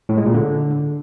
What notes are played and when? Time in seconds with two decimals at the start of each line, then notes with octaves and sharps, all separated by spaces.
0.09 A2
0.17 G#3
0.26 A#2
0.34 D3